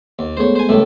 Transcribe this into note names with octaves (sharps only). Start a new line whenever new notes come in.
D#2
G#3 A3 B3 C5 C#5
C5 G#5
C#2 A2 G3 A3 A#4